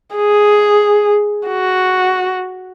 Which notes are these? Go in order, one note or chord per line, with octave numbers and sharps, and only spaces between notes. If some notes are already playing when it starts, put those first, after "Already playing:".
G#4
F#4